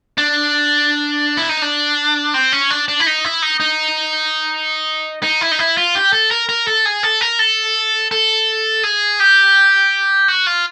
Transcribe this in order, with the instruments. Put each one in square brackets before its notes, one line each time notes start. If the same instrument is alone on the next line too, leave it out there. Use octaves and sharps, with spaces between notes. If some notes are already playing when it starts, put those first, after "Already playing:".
[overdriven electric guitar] D4
E4
D#4
D4
C4
C#4
D4
D4
E4
D#4
E4
D#4
D#4
D#4
E4
D#4
E4
F4
G4
A4
A#4
A#4
A4
G#4
A4
A#4
A4
A4
G#4
G4
F#4
F4